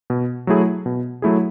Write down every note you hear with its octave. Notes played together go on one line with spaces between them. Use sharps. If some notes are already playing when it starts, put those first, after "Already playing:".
B2
F#3 A3 E4 G#4
B2
F#3 A3 E4 G#4